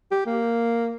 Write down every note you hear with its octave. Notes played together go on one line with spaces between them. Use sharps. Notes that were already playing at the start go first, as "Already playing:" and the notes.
G4
A#3